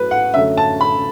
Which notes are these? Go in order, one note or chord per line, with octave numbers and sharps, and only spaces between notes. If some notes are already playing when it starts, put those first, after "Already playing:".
Already playing: A2 F#3 A3 B4
F#5
F#2 D3 A3 E5
A5
B5